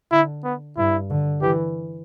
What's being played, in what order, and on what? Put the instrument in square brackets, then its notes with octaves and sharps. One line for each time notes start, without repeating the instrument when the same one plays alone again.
[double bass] D3 [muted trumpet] E4
[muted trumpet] B3
[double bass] G2 [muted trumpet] E4
[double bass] D3
[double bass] E3 [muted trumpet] G4